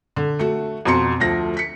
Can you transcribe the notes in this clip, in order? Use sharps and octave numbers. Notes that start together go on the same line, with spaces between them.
D3
A3 F#4
F2 B2 F#4 A#5 C6 C#7
D2 F3 A3 A#6
B6 C#7